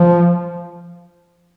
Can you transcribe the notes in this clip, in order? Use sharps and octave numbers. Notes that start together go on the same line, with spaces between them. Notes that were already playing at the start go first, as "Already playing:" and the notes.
Already playing: F3